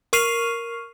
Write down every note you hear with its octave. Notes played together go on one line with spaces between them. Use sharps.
A#4 C#6 F6 C7 D#7 F7